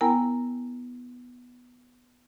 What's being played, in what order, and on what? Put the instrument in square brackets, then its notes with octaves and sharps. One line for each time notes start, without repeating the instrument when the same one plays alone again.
[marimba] B3 E4 A#4 G5 G#5 A#5